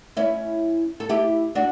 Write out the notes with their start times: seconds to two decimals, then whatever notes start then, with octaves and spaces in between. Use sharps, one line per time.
0.17 C#4 E4
1.00 A4
1.09 E4 G4
1.55 D4 F#4